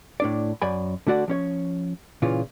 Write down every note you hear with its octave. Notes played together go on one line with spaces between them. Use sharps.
A2 D4 D5
F#2 D5 G#5 B5
D3 A3 F#4 D5 F#5
F3 C#4 C#5
A#2 C#3 E3 F4